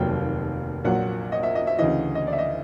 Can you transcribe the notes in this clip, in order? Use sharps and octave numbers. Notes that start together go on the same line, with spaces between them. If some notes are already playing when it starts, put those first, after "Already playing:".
Already playing: F1 D#2 D#3 F#3 G5
A#1 A#2 F#3 F#5
D#5
E5
D#5
E5
D2 C#3 E3 D#5
D#5
D5
E5
D#5